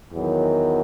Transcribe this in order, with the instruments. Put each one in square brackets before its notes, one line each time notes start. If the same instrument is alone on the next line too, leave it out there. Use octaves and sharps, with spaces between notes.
[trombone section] E2 D#3 F#3